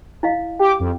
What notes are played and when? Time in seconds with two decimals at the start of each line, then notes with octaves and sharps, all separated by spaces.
0.23 E4 D#5 F5
0.59 G4 G5 D6
0.80 F2